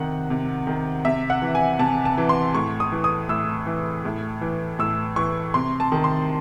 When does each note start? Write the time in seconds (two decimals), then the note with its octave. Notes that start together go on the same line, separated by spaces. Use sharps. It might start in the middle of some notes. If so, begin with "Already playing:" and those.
Already playing: C3 D#3 F#5
0.30 C3
0.67 D#3
1.05 C3 E5
1.30 F#5
1.42 E3
1.55 G#5
1.79 C3 A5
2.05 A5
2.18 E3
2.29 C6
2.55 A2 C#6
2.80 D#6
2.92 E3
3.04 D#6
3.29 A2 E6
3.66 E3
4.05 A2
4.41 E3
4.79 A2 E6
5.16 E3 C#6
5.54 C3 C6
5.80 A5
5.92 D#3
6.04 C6